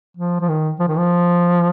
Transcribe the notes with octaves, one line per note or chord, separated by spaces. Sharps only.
F3
F3
D#3
F3
D#3
F3